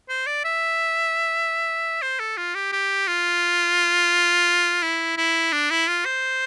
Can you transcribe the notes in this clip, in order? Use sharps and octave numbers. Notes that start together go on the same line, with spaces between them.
C5
D5
E5
C5
A4
F4
G4
G4
F4
E4
E4
D4
E4
F4
C5